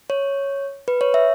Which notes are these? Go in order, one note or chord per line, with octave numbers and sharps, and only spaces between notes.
C#5
B4
C#5
E5